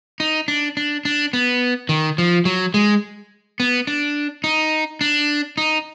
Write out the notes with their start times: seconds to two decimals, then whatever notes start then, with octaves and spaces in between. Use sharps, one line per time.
0.20 D#4
0.48 D4
0.77 D4
1.05 D4
1.33 B3
1.89 D#3
2.18 F3
2.45 F#3
2.74 G#3
3.60 B3
3.87 D4
4.44 D#4
5.01 D4
5.57 D#4